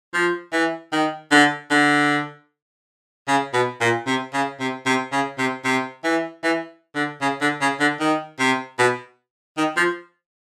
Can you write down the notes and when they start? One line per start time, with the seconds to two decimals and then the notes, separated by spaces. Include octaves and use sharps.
0.14 F3
0.52 E3
0.92 D#3
1.31 D3
1.71 D3
3.28 C#3
3.53 B2
3.80 A#2
4.06 C3
4.33 C#3
4.59 C3
4.86 C3
5.12 C#3
5.38 C3
5.65 C3
6.04 E3
6.43 E3
6.95 D3
7.21 C#3
7.41 D3
7.61 C#3
7.80 D3
8.00 D#3
8.39 C3
8.78 B2
9.57 D#3
9.77 F3